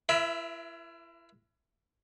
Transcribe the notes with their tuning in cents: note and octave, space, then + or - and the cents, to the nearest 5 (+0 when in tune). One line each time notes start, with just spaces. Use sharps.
E4 +35 A#4 +45 E5 +0